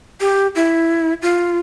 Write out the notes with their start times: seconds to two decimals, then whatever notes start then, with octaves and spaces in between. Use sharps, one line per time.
0.21 G4
0.55 E4
1.22 F4